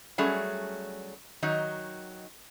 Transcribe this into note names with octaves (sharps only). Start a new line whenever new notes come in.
F#3 G3 A3 C#4 G#4
D#3 F#3 D#4